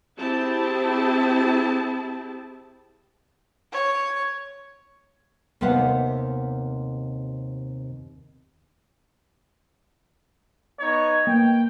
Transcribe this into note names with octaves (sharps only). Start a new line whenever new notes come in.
C4 E4 G4 G#4 A5
C#5
D#2 C3 B3 F5 F#5
B3 D#4 C#5
A#3 G5